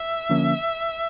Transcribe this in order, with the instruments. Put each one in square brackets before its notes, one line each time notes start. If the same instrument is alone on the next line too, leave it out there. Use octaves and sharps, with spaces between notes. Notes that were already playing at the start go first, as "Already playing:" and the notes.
Already playing: [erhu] E5
[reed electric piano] D3 F3 A#3 C#4